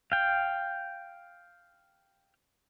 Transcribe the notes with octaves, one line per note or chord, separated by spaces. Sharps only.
F5 G5